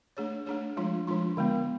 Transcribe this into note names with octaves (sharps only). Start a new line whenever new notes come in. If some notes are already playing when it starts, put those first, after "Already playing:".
A3 D4 G#4 C#5
A3 D4 G#4 C#5
F3 G#3 D4 F4
F3 G#3 D4 F4
D3 G#3 B3